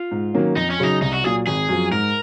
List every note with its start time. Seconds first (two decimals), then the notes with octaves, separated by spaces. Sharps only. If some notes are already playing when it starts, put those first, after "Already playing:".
Already playing: F4
0.11 G#2
0.34 D#3 F#3 A#3 C#4
0.56 F2 D#4
0.70 C#4
0.79 C#3 F#3 D#4
1.01 C2 D#4
1.13 F#4
1.23 A#2 F#3 G#4
1.47 G#1 G#4
1.69 F#2 F3
1.91 G#2 A#4